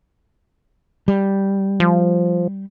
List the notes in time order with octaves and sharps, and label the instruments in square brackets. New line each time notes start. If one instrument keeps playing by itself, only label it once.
[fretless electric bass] G3
[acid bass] F3